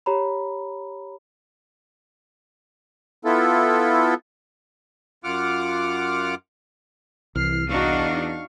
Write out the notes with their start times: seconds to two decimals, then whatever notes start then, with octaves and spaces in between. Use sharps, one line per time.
0.06 G4 C#5 A#5 B5
3.25 B3 E4 F4 A4
5.24 F#2 F4 F#5 D6 F6
7.35 C2 E3 F6 C7
7.69 E2 D4 D#4 F#4 F5 C#6